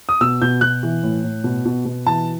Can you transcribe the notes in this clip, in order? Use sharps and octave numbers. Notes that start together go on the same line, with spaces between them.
D#6
B2 E6
B2 G6
B2 F#6
E3
A2
A2
B2
B2
B2
E3 A5